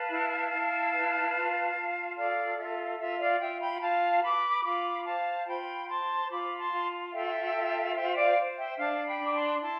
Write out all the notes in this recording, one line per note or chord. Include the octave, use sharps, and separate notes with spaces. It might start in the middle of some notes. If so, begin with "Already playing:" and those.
Already playing: B4 F5 A5
E4
E4
B4
F4
F4
A4 D5 F5
F4 E5
F4 E5
D5 F5
F4 E5 G5
G5 B5
F4 F5 A5
B4 B5 D6
F4 B5 D6
C5 F5 A5
F4 G5 B5
C5 A5 C6
F4 B5 D6
A5 C6
F4
A4 E5 G5
F4
C5 E5 G5
D5 F5
C5
E5 G5
D4 F5 A5
G5 B5
D4
D6
A5 C6
E4 A5 C6